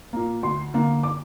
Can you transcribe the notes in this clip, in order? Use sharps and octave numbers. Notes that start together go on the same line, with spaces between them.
A#2 A#3
D2 C6
D3 A#3
D6